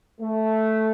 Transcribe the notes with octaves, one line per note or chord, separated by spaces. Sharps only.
A3